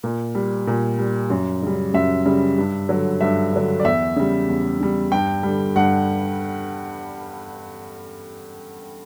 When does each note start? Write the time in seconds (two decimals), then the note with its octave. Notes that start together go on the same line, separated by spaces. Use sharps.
0.04 A#2
0.35 G3
0.67 A#2
0.99 G3
1.30 F#2
1.62 C#3 G3
1.94 F#2 E5
2.26 C#3 G3
2.58 G2
2.89 D3 F#3
3.21 G2 E5
3.53 D3 F#3
3.80 D5
3.84 E2 E5
4.16 C#3 G3
4.49 E2
4.80 C#3 G3
5.12 G2 G5
5.43 D3 G3
5.76 G2 F#5